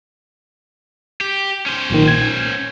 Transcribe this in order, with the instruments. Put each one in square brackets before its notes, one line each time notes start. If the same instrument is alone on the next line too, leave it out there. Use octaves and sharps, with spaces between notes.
[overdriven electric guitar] G4
C#4 C5
[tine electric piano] B1 A#2 D#3
G#6